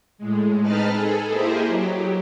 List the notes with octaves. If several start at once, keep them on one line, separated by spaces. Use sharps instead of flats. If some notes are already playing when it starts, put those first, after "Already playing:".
A2 G#3
C4 D#4 B4 D#5 A5 F6
G#4 A4
A#3 E4 G4 G#4 C5 D#5
F#3 G4